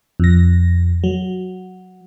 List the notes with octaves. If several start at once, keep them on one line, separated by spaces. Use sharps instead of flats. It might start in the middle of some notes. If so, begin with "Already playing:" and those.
F2 A#6
F#3